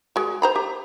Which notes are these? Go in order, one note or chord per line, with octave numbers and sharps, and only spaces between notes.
G#3 F#4
C5 A#5 B5
G4